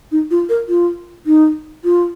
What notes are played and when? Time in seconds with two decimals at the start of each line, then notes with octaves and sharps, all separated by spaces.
0.12 D#4
0.31 F4
0.49 A#4
0.69 F4
1.26 D#4
1.84 F4